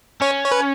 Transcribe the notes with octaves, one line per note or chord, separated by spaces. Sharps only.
C#4 C#5
C#5
B4